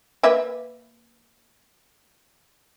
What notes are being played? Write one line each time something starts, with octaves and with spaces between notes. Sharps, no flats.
A#3 B4 E5